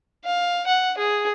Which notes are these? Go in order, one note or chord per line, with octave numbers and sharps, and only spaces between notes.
F5
F#5
G#4